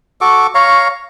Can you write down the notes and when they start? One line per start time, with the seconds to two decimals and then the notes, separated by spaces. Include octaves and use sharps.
0.21 F#4 A4 C#6 D6
0.55 C#5 F5 A#5 C#6